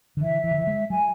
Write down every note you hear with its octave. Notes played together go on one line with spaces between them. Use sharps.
D3
E3 E5
E3
D3
E3
G#3
F#3 G#5